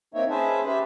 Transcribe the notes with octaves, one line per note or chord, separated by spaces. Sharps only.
A#3 C4 D#4 C#5 E5
C#4 G#4 B4 C5 E5 A5
G4 B4 C5 E5